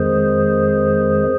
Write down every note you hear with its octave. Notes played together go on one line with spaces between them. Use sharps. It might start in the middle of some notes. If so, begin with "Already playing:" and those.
Already playing: F2 D#3 G#3 G#4 C5